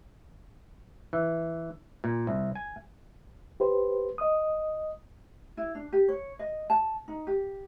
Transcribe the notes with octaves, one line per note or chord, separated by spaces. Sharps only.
E3
A#2
C2
G#5
G4 B4 C5
D#5 D#6
E4
D4
G4
C#5
D#5
A5
D#4
G4